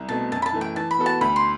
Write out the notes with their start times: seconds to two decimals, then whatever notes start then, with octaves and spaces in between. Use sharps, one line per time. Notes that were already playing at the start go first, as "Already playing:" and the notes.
Already playing: C2
0.09 B2 A3 C4 A5
0.31 F#2 A5
0.42 B5
0.46 A5
0.53 E3 A3
0.61 G5
0.76 E3 A5
0.91 B5
0.98 B3 F#4 A4
1.06 A5
1.21 D2 B5
1.36 C6